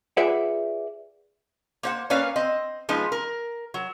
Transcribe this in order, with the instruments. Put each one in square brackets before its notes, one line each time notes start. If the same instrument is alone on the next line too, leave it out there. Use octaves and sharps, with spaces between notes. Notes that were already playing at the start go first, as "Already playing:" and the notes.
[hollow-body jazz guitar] F4 G#4 B4 D5 E5 F#5
[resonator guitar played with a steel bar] A#3 C5 F#5
A#3 C#4 B4 C#5 D5 F5
C4 D#5
F3 G#3 B3 D#4
A#4
F#3